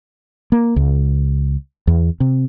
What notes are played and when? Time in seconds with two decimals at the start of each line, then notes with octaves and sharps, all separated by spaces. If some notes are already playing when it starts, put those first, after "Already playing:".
0.52 A#3
0.76 C#2
1.87 E2
2.20 C3